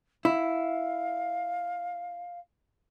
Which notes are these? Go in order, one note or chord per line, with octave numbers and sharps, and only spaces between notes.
E4 F5